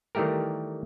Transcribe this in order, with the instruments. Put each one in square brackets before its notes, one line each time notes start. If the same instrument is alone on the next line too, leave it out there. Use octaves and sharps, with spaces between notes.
[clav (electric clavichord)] D#3 E3 G3 A3 G4 A#4